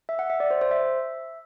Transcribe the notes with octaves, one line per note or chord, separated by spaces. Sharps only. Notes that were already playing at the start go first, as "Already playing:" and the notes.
E5
F#5
E5
D5
C5
C5
E5